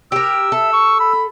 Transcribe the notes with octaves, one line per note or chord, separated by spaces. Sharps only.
G4 A#4 E6
A4 E5
C#6
B5